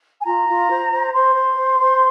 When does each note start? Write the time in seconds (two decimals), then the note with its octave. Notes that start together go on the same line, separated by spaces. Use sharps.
0.21 G#5
0.25 F4 A#5
0.47 F4
0.69 C5
0.91 C5
1.13 C5 C6
1.34 C5
1.57 C5
1.79 C5